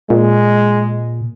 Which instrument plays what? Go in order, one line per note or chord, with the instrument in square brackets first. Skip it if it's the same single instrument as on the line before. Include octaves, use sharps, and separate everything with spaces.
[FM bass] A#2 [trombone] G#3